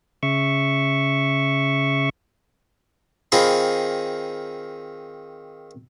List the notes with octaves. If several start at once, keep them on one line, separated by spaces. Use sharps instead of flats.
C#3 E5 C#6
D#3 C4 F4 G#4 B5